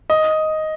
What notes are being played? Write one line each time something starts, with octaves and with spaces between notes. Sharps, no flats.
D#5